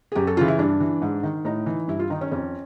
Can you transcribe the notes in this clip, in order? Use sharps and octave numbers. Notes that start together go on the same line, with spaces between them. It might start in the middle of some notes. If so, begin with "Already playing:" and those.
G#4
F#2 G4
A4
C#3 E3 F4
E4
G2 D4
E3
G#2
D#3
A2 D#4
E3
G2 E4
F4
D#3 D#4
C#4
F2 C#4